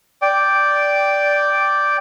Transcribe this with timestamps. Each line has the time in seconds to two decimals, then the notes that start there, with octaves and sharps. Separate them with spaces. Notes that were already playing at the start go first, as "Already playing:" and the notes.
0.22 D5 G5